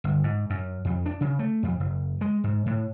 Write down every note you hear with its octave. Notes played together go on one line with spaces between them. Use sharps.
G1
G#2
F#2
F2
D4
C#3
A3
F2
F#1
G#3
G#2
A2